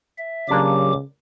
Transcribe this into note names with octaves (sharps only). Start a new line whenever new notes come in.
E5
C#3 F#3 A#3 D4 F4 G4 D6